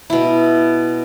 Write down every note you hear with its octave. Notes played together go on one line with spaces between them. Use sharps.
B2 E4